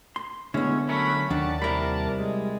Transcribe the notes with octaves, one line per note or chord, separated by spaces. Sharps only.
C6
D3 G#3 A3 B3 C#4 E4 C#5
F#3 A3 C#4 A#4 E5 F#5 B5
D#2 D#3 D4 D5 F#5 A5
C3 G3 E4 A#4 A#5 B5
G#3